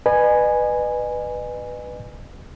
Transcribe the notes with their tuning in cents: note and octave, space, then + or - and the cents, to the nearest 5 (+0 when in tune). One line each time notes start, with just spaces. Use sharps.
B4 +0 D#5 -45 G#5 +0